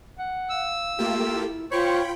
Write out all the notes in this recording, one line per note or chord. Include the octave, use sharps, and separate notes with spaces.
F#5
F5 E6
A3 A#3 F4 G4
E4
F4 C5 C#5 G5 B5 C#6